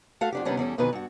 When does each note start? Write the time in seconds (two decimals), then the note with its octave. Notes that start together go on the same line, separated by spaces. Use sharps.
0.21 A3 F#4 A4 F5
0.32 F2 D4 G4
0.45 C3 D#3 G3 B3 C#4 D4
0.57 E2 G3 C#4 A4
0.78 F2 B2 D3 D#3 B4 G#5
0.93 G2 F#4